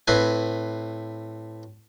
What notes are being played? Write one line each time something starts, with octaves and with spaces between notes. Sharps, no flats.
A2 C4 B4 G#5